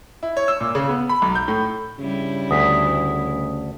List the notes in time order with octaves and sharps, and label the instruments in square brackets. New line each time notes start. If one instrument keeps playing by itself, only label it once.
[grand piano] E4
C#5
E6
A#2
C#3
B3
B5
B1
G6
A2
[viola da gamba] G2 G3 E4 [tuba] C#3
[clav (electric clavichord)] D2 [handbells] D#6 B6